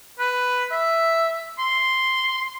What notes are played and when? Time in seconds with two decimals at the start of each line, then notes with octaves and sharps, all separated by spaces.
0.19 B4
0.71 E5
1.59 C6